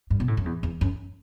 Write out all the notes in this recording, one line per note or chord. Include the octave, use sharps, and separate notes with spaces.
G2
B2
A2
F#2
E2
E2
F#2